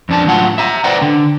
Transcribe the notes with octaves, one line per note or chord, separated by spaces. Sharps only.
F2 D4 A5
A2 F#3 F4 F#5
E5 A#5
B4 C5 D5 F#5 G5 A#5
D3